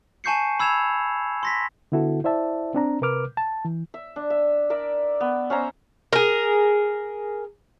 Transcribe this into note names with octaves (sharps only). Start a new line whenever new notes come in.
G#5 A5 C#6 G6 C7 C#7
B5 E6 G#6 E7 F7
C6 A#6 B6
D3 B3 E4 F#4 A4
E4 C5 D5 E5 A5
C4 D4 A#5
C3 A#4 B4 D6 F6
A5
E3
E5
D4
E5
A#4 D5 E5
B3
C#4 C5 E5 A#5
G#4 A#4